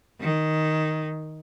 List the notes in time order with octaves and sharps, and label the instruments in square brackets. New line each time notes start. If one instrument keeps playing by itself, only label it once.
[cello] D#3